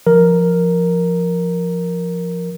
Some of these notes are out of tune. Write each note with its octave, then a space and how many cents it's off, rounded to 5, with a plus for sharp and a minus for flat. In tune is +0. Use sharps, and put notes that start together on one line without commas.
F3 -10 A#4 +0